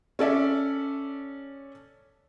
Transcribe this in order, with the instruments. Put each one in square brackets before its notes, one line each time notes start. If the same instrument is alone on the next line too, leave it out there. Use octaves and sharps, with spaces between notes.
[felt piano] C#4 A4 D5 E5